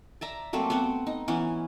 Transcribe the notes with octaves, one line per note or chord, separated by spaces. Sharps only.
D5 E5 A#5
F#3 A3 A#3 C4
B3 C4 F#5
D#4
E3 B3 C#4